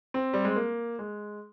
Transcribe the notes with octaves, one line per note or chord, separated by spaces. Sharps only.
C4
G3
G#3
A#3
G#3